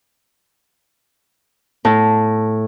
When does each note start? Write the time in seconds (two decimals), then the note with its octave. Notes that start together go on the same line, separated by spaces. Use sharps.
1.85 A2